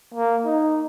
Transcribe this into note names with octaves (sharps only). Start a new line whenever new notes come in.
A#3
D#4